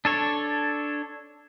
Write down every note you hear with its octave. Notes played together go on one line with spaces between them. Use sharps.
D4 A4 C#5